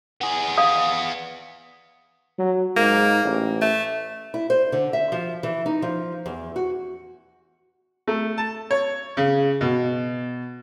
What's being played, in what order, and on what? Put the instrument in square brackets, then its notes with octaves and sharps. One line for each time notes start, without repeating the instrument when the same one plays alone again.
[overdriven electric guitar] B3 G#4
[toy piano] F5 D#6
[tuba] F#3
[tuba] G#2 [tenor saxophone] A#3
[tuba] A1
[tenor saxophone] A3
[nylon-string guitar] E4
C5
D3
E5
F3
E3
D#4
F3
E2
F#4
[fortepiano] A3
A5
C#5
C#3
B2